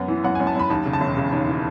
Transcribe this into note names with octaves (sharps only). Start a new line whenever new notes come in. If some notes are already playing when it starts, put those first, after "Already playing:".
Already playing: F#2 B3
E3
F#2 F#5
F#2 G#5
A5
F#2 B5
D#2 A5
C#3
A5
E1
C#3
D#2
E3